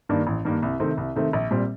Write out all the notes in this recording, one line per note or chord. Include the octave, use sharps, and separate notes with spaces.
G2 D#3 A#3 D4
A1
G2 D#3 A#3 D4
C2
C3 D#3 A3 C4
C2
C3 D#3 A3 C4
A#1
A#2 G3 C4